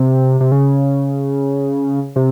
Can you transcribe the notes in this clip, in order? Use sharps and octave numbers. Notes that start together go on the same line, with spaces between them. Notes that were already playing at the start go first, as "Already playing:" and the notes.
Already playing: C3
C3
C#3
C3